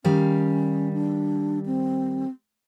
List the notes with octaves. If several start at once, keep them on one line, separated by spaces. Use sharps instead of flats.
D#3 G3 C#4 F5
D4
C4